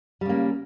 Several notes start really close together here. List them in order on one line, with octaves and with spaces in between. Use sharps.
G3 C#3 A#3